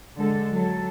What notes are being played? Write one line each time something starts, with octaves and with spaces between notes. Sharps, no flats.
D3 G#3 A4
F#3 A4